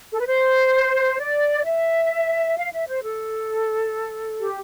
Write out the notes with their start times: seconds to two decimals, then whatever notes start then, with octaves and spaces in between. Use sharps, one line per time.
0.13 A4
0.20 B4
0.27 C5
1.19 D5
1.65 E5
2.57 F5
2.73 E5
2.88 C5
3.03 A4
4.41 G4